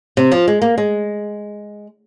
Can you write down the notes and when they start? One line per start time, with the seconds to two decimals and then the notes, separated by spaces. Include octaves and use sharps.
0.17 C3
0.32 F3
0.48 G#3
0.62 A#3
0.78 G#3